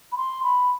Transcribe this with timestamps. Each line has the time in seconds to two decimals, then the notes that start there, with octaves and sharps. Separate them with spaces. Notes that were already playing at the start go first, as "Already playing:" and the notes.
0.12 B5
0.17 C6
0.43 B5